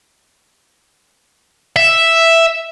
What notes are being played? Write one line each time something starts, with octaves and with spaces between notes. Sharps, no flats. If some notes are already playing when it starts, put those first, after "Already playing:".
E5